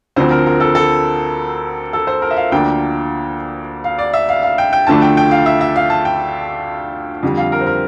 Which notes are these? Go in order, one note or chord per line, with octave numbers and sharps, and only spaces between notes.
D2 D3 F3 C4 C5
A#4
A#4
A4
A4
A4
C5
A#4
E5
F5
D2 D3 F3 A#3 D4 G5
F5
D5
E5
F5
F5
G5
G5
D2 D3 F3 A3 D4 A5
G5
G5
F5
E5
E5
F5
A5
G5
F2 D3 G3
F5
A#4
C5
A#4